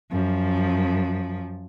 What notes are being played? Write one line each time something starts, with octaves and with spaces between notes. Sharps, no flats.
F#2 F3